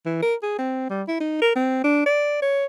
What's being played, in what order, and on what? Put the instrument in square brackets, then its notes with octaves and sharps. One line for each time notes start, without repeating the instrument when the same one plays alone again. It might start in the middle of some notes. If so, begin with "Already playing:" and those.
[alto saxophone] E3
A#4
G#4
C4
G3
E4
D#4
A#4
C4
D4
D5
C#5